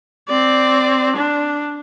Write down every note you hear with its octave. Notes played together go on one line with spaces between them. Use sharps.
C4 D5
D4